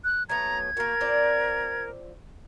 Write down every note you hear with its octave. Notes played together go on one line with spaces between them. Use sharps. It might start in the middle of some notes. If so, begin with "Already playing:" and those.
F#6
F#3 A3 B3 A#5 G#6
A#3 F#4 A#4
C4 F4 D5